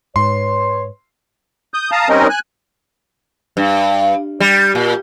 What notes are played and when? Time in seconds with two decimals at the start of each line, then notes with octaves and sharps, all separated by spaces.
0.16 G#2 B4 C#5 C6
1.74 D#6 G6
1.91 F5 A5 A#5 D#6
2.09 G3 C4 C#4 D#4 A#4 D#5
2.29 G#5 F#6
3.57 G2
4.40 G3
4.75 A#2